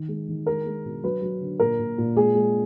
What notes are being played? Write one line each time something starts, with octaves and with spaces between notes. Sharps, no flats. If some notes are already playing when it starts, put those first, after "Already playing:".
Already playing: D#3
G#3
D#3
G#3 A#4
G#3
B2
F#3 B4
F#3
D3
A#2 A#4
A#2
A#2
G#3 G#4
G#3